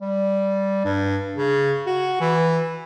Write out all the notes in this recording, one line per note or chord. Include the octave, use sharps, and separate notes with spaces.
G3
G2
C#3
F#4
E3